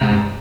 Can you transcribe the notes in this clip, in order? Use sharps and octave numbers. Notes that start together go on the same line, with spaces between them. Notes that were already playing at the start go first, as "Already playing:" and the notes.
G#2 C3
G2